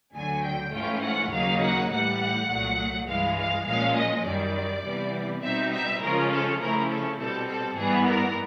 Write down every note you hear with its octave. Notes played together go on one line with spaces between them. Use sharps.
D2 D3 F#3 G#5
G5
G#2 E3 A3 C#4 F4 G5
F#5
D#2 C#3 F#3 A#3 D#4 F5
F#5
A2 E3 G3 F#5
C2 A#2 F#3 A3
G2 E3 G#3 F5
F5
A#2 F3 G#3 C#4 F5
D#5
F#2 D#3 G3 D5
C3 E3 G3 B3
B2 G3 C4 D#4 E5
E5
C#3 F3 G#3 C#4 F4 A#4
A4
C#3 F3 A3 C#4 E4 A#4
A4
B2 G3 C4 A4
A4
G#2 E3 G3 B3 G#4
A#4